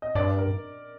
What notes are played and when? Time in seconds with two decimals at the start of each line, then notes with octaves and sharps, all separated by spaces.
0.02 D#5
0.15 G2 D5
0.38 A#4